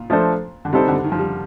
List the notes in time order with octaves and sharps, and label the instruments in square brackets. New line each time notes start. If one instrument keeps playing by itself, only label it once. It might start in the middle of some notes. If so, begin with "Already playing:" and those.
Already playing: [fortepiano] A#2
[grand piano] F3 A3 D4 A4 C5
[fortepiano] D3
[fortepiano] C3 [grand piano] G3 C4 D#4 A4 C5
[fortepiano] D3
D#3
F3
G3